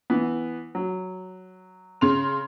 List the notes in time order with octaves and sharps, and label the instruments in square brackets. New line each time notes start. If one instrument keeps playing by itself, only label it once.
[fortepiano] E3 B3
F#3
[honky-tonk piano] C#3 C6 F7